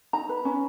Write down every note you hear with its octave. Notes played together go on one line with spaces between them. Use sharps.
D#4 A#5
B4
C#4